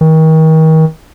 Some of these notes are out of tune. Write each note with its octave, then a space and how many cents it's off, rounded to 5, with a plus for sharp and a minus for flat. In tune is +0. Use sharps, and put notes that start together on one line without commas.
D#3 +35